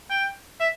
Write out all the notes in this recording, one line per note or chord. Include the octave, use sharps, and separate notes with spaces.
G5
E5